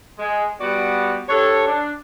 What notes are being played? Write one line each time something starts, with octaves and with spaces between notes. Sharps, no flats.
G#3
G3 B3 F#4 D5 F#5
D4 G4 A4 C#5
D4